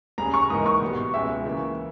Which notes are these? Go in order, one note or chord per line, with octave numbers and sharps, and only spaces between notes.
G3 C#4 G#4 A#5
C#6
G#2 E3 A#3 D#4 A#4 D#6
C#6
B2 G3 B3 G4
C#2 B2 G#3 C#4 G4 E5
C#3 E3 A#3